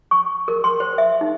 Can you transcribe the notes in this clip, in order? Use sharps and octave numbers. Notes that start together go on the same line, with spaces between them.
C#6
A#4
C6
C5
E5
D#4